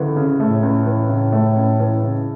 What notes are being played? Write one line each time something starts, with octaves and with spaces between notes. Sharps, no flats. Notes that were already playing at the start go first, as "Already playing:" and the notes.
Already playing: C#2 D3 E3
C#3
A2 A3
C#2
E3
C#3
A3
C#2
E3
C#3